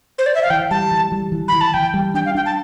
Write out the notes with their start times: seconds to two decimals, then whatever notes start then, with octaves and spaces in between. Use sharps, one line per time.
0.19 C5
0.26 D5
0.35 E5
0.43 F5
0.50 E3 G5
0.71 G3 A5
0.91 E3
1.12 G3
1.32 E3
1.48 E3 B5
1.61 A5
1.74 E3 G5
1.94 G3
2.14 D4 G5
2.26 F5
2.35 D4 G5
2.46 A5